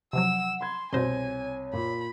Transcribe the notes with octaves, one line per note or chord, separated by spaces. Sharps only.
C3 F3 F#3 F#5 E6
B5 C6 G#6
C2 B2 C5 C#5 G#5 C6 A#6
A#2 F4 B5